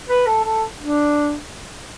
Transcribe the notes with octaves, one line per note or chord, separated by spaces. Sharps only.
B4
A4
A4
D4